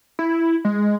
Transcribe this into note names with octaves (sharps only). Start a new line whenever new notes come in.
E4
G#3